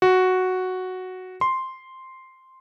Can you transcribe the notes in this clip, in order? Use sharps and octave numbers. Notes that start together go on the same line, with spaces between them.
F#4
C6